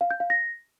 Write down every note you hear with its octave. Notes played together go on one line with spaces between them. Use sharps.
F5
G6
F5
A#6